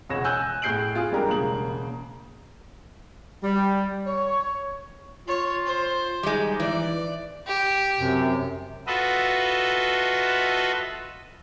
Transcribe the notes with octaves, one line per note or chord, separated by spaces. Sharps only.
E1 C#2 C#5 F#5 A#6 E7
G#5 E6 F#6 G6
A2 G#4 G6 C7 D7 F#7
F4 G#4
G3 G#3 D4 G4 A#4
E1 C#3 A#3 F#7
G3
C#5
F4 C#5
C5
G3 G#3 D#4
E3 D5
G4
F#2 C3
F4 F#4 A4 B4 D#5 E5